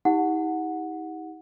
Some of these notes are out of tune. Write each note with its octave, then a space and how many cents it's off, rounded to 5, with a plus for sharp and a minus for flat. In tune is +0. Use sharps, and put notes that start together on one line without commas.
D#4 +45 G4 +15 F#5 -10